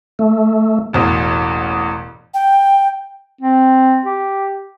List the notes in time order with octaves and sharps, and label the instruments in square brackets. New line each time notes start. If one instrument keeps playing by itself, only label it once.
[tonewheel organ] A3
[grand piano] E1 A1 E2
[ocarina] G5
[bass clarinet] C4
G4